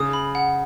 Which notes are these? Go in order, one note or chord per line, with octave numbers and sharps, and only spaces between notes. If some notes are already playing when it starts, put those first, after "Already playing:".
Already playing: C#3 D#6
B5
F#5